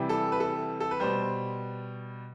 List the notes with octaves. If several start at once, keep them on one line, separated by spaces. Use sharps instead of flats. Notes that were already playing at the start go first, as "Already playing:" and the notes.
Already playing: C3 E3 G3
A4
B4
A4
A4
B4
B2 G3 C5